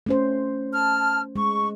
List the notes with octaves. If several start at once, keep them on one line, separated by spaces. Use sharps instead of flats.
A3 C#4 C5
A5 F6
G#3 C#6